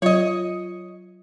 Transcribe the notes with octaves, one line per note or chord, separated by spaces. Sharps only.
F#3 F4 C#5 D#5